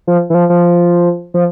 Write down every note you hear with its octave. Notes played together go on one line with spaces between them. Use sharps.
F3
E3
F3
F3
F3